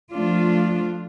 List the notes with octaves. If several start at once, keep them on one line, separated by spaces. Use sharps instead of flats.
F3 A3 D4 F4